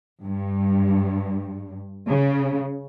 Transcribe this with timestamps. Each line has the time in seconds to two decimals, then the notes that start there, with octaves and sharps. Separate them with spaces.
0.23 G2
2.07 C#3